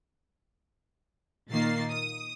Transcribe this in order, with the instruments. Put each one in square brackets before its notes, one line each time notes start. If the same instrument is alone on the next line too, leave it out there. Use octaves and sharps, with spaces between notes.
[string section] A#2 D#3 A#3 A6 C7
D#6